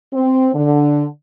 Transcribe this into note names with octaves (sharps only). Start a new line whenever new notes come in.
C4
D3